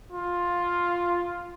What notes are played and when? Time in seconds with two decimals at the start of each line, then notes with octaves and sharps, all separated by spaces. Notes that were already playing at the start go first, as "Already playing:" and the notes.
0.12 F4